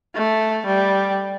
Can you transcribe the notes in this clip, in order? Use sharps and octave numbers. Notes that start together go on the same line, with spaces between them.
A3
G3